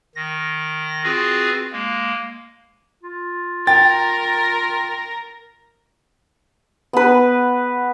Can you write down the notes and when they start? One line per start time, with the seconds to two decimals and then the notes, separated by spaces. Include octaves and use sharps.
0.15 D#3 A#6
1.04 C4 F4 F#4 G#4 B4
1.72 G#3 A#3
3.03 F4
3.67 A#4 G5 A#5 A6
6.93 B3 B4